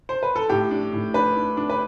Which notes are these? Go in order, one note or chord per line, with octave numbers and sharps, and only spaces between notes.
C5
B4
A4
A2 G4
D4
A2
D4 B4
D4
D4
B4